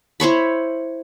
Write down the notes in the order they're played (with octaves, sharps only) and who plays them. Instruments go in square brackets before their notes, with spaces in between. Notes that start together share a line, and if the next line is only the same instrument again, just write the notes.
[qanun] E4 C5 C#5 B5